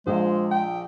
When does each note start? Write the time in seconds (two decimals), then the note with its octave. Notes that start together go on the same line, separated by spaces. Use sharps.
0.07 A#1 F3 G#3 C5
0.51 G5